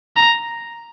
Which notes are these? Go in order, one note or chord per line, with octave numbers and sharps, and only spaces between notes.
A#5